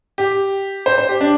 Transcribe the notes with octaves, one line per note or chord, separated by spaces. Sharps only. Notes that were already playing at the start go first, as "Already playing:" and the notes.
G4
C5
C5
G4
D4